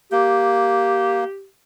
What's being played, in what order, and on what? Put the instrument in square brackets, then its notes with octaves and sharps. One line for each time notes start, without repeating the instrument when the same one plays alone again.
[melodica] A#3 [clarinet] G4